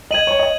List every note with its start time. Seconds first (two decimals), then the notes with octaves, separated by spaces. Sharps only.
0.11 D#5 G#6 D#7 F#7
0.27 C#5
0.39 D#5